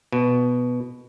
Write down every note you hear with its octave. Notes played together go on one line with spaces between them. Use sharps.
B2